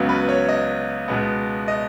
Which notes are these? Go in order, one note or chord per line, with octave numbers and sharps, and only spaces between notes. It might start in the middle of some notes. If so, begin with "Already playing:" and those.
Already playing: C#2 C#3 F#3 B3
B4
C#5
D#5
C#2 B2 G#3 B3
D#5